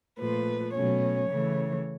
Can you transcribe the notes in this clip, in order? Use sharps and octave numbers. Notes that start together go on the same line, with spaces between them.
A#2 F3 A3 B4
B2 F#3 A3 C#4 C#5
C#3 E3 A3